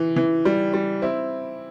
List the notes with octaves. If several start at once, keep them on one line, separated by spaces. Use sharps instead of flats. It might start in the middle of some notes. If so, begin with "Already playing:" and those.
Already playing: E3
E3
G3
G3
C4 E4